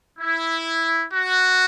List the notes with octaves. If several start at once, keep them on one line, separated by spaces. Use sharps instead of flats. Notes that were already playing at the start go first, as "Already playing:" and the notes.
E4
F#4